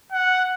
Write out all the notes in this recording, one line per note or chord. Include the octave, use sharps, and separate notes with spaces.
F#5